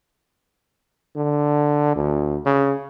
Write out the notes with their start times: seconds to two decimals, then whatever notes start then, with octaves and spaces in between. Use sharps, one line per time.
1.16 D3
1.96 D2
2.46 C#3